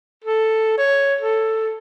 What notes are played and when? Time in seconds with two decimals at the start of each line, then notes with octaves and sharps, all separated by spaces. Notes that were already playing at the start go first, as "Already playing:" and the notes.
0.24 A4
0.78 C#5
1.21 A4